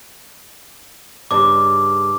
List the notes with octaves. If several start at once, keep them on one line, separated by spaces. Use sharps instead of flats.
G2 C#3 D6